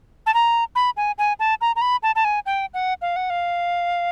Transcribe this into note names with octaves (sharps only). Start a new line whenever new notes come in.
A5
A#5
B5
G#5
G#5
A5
A#5
A#5
B5
A5
A5
G#5
G5
F#5
F5
F#5
F5